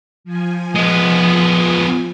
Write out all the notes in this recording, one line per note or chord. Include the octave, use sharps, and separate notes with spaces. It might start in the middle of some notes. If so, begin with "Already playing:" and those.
F3 G#5
G#3 B3